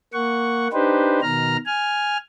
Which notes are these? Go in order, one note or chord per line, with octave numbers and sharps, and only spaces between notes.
A#3 F#5 C#6
D4 D#4 G4 B4 C5
B2 D#3 A#5 F6
G#5 F6